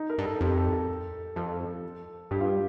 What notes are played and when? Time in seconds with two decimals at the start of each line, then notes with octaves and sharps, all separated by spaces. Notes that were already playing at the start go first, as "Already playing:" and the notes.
Already playing: D#4
0.10 A#4
0.18 G2
0.25 A4
0.41 F2 G4
0.57 A4
0.73 A4
1.36 F2 A4
2.31 G2 G4
2.40 F4
2.46 G4